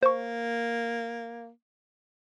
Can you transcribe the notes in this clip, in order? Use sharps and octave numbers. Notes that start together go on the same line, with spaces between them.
A#3 C5 C#6